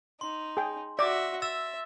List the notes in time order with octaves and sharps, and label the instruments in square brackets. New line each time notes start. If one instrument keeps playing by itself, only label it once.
[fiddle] D#4 [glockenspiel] C6
[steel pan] G#4 G5
[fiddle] F#4 E5 [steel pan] D5 D6 [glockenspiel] A#6
[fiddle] E5 [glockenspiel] E6 A6 E7